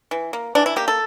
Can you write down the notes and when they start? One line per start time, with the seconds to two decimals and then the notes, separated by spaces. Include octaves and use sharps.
0.11 E3
0.33 A#3
0.55 E3 D4
0.66 E4
0.76 A#3 G4
0.88 A4